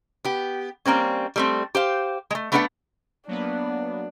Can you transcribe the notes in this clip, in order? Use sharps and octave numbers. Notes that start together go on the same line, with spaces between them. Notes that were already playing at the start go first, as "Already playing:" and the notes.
B3 G4
G3 A#3 C4 C#4
G3 A3 C4
G4 C5 F5
G#3 A3
A3 B3 D4 B4 D5 F#5
F#3 A#3 B3 D4